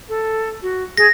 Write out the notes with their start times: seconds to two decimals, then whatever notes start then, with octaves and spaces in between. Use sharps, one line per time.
0.09 A4
0.62 F#4
0.97 G#4 A#6